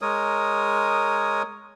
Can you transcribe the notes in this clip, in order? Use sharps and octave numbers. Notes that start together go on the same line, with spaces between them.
G#3 A#4 C#5 D#6